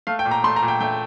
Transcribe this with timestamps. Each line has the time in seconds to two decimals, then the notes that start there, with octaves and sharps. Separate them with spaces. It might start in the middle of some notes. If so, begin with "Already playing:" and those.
0.07 A3 F5
0.19 G5
0.25 A#2
0.31 A#5
0.44 A3 C6
0.56 A#5
0.62 A#2
0.68 G5
0.80 A3 G5